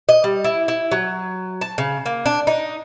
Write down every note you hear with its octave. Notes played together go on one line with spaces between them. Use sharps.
D#5
G3
E4
E4
F#3
A5
C#3
A#3
D4
D#4